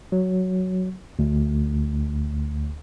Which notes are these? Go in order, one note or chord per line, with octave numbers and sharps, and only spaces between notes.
F#3
D2